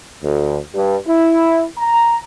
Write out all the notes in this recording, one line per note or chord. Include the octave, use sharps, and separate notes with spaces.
D2
G2
E4
A#5